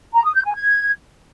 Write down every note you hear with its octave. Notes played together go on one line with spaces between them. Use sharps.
A#5
D#6
G6
G#5
G#6